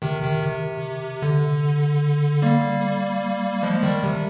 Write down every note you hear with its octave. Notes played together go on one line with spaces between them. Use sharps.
C3 D#3
C3 D#3
C3
D3
G3 A#3
F3 G#3
D#3 G3
C3